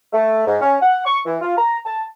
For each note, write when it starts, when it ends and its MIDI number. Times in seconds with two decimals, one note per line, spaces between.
0.13 0.46 57
0.47 0.59 44
0.61 0.77 61
0.81 1.05 78
1.05 1.19 85
1.26 1.37 52
1.41 1.54 65
1.57 1.78 82
1.85 2.03 81